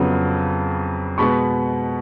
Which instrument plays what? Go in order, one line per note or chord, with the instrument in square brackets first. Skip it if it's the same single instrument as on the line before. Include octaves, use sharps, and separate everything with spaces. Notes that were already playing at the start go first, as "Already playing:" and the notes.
Already playing: [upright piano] F2 C#3 F#3 B3
B2 G#3 B3 B5 C#6